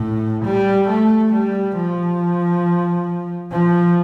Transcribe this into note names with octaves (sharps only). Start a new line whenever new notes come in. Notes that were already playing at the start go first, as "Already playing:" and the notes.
Already playing: A2
G3
A3
G3
F3
F3